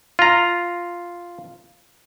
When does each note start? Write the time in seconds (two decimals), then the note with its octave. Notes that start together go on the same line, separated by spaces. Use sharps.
0.19 F4 A#5